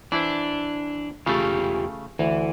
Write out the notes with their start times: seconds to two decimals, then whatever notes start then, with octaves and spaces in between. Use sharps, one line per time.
0.12 E3 D4 E4 C5
1.26 E2 C#3 A3 F4 G4
2.19 D2 E3